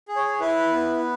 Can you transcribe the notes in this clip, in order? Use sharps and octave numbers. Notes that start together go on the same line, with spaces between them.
G#4
C#5
E4 B4
B3